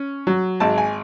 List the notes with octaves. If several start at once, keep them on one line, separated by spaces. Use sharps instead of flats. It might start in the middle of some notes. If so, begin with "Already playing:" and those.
Already playing: C#4
F#3
G#1 A5
G#5